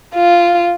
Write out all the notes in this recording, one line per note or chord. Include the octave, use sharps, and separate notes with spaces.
F4